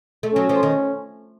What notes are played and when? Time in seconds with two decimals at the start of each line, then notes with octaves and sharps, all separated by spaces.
0.23 A3
0.34 F#3 C#4
0.49 F3
0.63 D#3